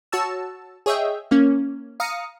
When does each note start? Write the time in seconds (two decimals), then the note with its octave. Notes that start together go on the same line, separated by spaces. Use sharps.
0.12 F#4 C#5 A5 E6
0.86 G#4 C#5 D#5 E5 G5
1.31 A#3 C#4
2.00 F5 A#5 D#6 C#7